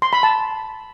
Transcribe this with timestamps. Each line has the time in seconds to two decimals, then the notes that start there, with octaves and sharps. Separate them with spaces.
0.02 C6
0.13 B5
0.23 A5